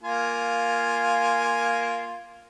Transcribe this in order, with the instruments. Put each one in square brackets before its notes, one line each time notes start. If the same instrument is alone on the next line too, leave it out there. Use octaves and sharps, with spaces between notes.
[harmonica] A#3 F4 G#5